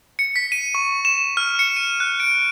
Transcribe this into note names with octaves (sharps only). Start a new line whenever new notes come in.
C#7
B6
D#7
C#6
E7
F6
C#7
D#7
F#6
D7